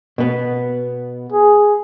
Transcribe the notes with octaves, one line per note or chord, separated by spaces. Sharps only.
B2 B3
G#4